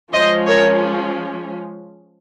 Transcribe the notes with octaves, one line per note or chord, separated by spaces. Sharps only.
F3 G#3 C#4 C5 D#5
A#4 C#5